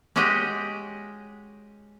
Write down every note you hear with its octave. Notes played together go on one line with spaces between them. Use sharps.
G#3 C#4 F#4 G4 D#5